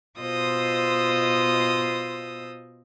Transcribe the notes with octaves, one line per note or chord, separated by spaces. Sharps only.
B2 F4 C5 D#5 D#6 E6